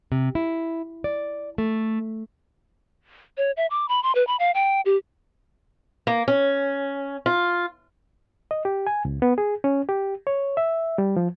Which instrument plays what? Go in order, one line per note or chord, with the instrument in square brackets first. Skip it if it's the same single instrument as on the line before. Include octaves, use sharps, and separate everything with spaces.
[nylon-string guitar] C3
E4
D5
A3
[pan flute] C#5
E5
D6
B5
C6
B4
B5
F5
G5
G4
[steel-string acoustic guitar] A#3
C#4
F4
[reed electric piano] D#5
G4
G#5
C#2
B3
G#4
C#4
G4
C#5
E5
G3
F3